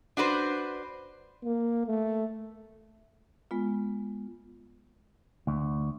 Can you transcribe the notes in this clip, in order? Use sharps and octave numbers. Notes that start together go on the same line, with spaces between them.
D4 F#4 B4 C5
A#3
A3
G#3 B3 F4
D2